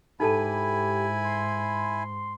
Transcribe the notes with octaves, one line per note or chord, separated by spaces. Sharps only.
G#2 D#4 E4 G4 A4 G#5 A5 B5
C6